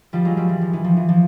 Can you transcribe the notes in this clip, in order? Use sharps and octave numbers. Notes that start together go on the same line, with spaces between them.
F3 G3
F#3 G#3
F3 G3
E3
F3
E3
F3
E3
F3